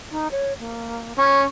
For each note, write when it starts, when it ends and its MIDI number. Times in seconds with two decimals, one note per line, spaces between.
0.11 0.31 63
0.31 0.53 73
0.60 1.13 58
1.18 1.42 61
1.18 1.46 85